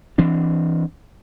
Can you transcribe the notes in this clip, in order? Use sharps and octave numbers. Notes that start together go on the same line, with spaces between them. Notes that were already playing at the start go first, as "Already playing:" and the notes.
E3 C4 D4